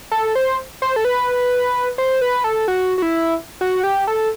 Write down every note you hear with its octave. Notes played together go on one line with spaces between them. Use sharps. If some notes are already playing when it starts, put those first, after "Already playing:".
A4
C5
C5
A4
B4
C5
B4
A4
F#4
F#4
E4
F#4
G4
A4